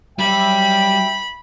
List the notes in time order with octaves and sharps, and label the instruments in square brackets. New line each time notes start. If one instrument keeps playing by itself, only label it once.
[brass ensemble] F#3 E5 G5 [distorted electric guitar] G3 [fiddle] B5